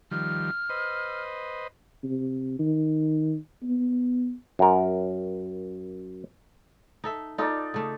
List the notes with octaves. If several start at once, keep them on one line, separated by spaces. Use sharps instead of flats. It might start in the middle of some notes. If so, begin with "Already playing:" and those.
D#3 F3 G3 F6
B4 C5 D#5
C3
D#3
B3
F#2 A#4
D#4 A4 E5
D#4 F4 A4 D5
C#3 A3